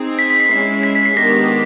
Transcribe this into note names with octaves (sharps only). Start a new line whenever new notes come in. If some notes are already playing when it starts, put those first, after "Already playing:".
Already playing: C4 D#4 G#4
B6
B6
C7
G#3 C#4 E4 C7
B6
B6
C7
D#3 G#3 B3 D4 G4 A#6